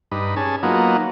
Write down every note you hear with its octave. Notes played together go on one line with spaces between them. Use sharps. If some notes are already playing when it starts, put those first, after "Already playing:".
G2 D#4 B4
C#4 G#4 A5
F#3 A#3 B3 D#4 F4